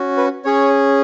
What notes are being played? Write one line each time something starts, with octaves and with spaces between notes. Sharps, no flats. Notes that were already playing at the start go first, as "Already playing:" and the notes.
Already playing: C#4 F#4
B4
C#4 G#4 C#5